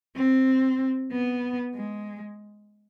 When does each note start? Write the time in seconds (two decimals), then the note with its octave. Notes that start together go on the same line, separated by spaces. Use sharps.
0.16 C4
1.12 B3
1.75 G#3